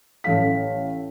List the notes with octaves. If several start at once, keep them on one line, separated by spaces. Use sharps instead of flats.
A1 A4 F5 B6